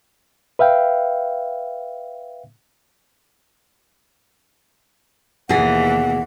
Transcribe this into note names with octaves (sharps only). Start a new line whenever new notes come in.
B4 E5 F5 G5
D#2 B2 E3 G#4 F#5